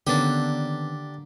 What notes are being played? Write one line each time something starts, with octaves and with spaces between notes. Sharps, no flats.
D3 D#3 A#3 B3 C#4 D4 G4